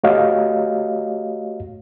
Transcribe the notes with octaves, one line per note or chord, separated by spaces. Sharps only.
A3 F#4 G4 C#5 D#5 F5